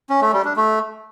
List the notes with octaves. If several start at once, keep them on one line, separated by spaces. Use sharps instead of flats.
C#4
A3
G3
D4
A3